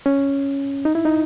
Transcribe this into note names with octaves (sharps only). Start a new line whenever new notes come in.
C#4
D#4
E4
D#4